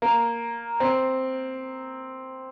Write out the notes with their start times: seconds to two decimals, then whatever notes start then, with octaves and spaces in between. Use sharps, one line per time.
0.02 A#3
0.80 C4